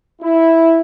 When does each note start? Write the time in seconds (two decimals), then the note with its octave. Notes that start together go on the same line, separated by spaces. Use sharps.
0.22 E4